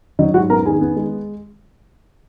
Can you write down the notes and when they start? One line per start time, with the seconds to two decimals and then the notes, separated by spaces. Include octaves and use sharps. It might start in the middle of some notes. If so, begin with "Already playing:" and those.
0.19 F#3 D#4 D#5
0.34 G#2 F#4 F#5
0.50 B3 A#4 A#5
0.66 D#3 G#4 G#5
0.81 B3
0.96 G#3